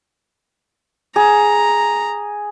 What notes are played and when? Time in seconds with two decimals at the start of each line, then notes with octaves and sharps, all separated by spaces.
1.16 G#4 A#5